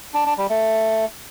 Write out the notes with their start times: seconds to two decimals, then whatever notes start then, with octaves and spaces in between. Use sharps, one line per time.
0.14 D4
0.26 D4
0.38 G3
0.50 A3